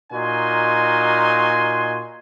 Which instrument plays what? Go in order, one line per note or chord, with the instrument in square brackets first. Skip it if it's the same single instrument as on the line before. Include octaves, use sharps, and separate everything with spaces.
[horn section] A#2 D#4 F#4 G#5 C6